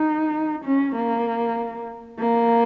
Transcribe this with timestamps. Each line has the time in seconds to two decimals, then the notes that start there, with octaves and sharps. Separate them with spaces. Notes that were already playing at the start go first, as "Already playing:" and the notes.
Already playing: D#4
0.64 C#4
0.95 A#3
2.20 A#3